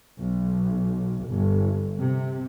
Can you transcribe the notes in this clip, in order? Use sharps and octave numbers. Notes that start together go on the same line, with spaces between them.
B1
G1
C3